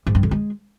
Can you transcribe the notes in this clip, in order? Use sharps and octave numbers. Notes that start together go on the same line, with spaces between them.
G#2
G2
D3
G#3